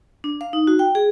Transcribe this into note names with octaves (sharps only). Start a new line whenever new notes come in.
D4
F5
D#4
F#4
G5
G#4